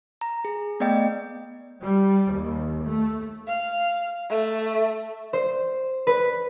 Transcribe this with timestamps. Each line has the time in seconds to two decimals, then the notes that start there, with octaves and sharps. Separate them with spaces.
0.21 A#5
0.45 G#4
0.80 A3 B3 D5 D#5 G5
1.83 G3
2.33 D#2
2.84 A3
3.48 F5
4.29 A3
5.33 C5
6.07 B4